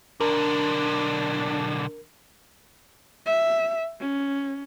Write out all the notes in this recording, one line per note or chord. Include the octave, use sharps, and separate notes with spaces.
B1 D3 D4 A#4
E5
C#4